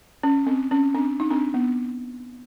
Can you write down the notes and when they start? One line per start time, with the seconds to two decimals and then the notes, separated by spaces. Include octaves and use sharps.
0.23 C#4
0.47 C4
0.71 C#4
0.94 C4 D4
1.20 D#4
1.30 C4 D4
1.54 B3